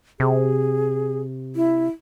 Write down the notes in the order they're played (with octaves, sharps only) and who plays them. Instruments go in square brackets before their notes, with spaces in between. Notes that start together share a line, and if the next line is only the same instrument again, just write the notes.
[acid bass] C3 [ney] G#4
[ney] E4